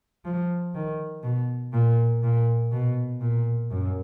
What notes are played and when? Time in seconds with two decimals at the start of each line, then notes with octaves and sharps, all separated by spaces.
0.25 F3
0.75 D#3
1.23 B2
1.73 A#2
2.23 A#2
2.72 B2
3.21 A#2
3.71 F#2